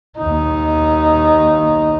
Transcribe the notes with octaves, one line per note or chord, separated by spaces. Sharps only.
D#2 D#4